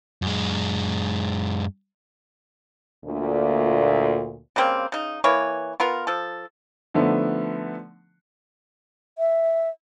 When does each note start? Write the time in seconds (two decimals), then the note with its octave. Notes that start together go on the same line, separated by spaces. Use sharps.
0.22 F#2 G#3
3.06 D2 A#2
4.56 C#3 G3 A#3 C4
4.92 C#3 D#4
5.24 E3 A#3 B4 C#5
5.80 B3 F4 A#4
6.07 F3 A4
6.94 D3 F3 A3 B3 D#4
9.18 E5